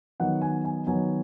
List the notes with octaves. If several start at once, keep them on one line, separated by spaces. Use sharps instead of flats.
D#3 F#3 B3 F#5
G#5
G#5
D#3 F#3 B3 G#5